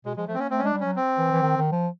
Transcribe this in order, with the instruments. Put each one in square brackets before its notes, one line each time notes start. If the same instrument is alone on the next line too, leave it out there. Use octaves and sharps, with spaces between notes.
[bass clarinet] B2 [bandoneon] G#3
[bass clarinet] F3 [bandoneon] G#3
[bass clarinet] F3 [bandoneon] A3
[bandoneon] C4
[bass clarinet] A#3 [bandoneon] C#4
[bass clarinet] A3 [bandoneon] C4
[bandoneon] C#4
[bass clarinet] G#3 [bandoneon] D4
[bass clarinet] G3
[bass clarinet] F#3 [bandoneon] C#4
[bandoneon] C4
[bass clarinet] E3
E3
D#3
D#3
F3